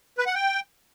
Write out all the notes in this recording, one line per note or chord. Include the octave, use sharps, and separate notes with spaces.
B4
F#5
G5